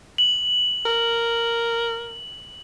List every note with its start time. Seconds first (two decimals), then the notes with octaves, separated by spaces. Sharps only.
0.18 F#7
0.86 A#4